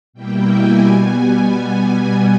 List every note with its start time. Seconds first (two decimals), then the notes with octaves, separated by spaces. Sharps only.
0.13 B2 G3 A#3 E4 G5
0.49 G#5
0.85 B2 G3 B3